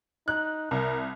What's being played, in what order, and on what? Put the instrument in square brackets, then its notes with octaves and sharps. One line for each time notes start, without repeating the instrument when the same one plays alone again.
[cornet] D#4 [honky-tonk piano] F#6
[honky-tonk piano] C2 [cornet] A#4